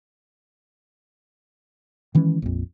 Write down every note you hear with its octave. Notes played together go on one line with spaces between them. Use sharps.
D#3 E3 G#3 C#4
A#1 F2